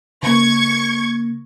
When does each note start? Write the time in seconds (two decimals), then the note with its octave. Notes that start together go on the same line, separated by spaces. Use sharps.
0.23 C#3 A#3 C#6 G#6